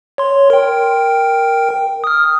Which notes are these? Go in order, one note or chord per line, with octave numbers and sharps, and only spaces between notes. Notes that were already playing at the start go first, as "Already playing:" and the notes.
C#5 C6
A#4 G5
D#6 F6